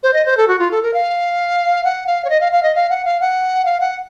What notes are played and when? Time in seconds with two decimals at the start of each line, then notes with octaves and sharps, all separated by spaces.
0.03 C5
0.13 D#5
0.26 C5
0.37 A4
0.48 F#4
0.59 F4
0.71 A4
0.83 A#4
0.94 F5
1.84 F#5
2.07 F5
2.25 C#5
2.30 D#5
2.40 F5
2.52 F5
2.63 D#5
2.75 F5
2.90 F#5
3.05 F5
3.20 F#5
3.65 F5
3.80 F#5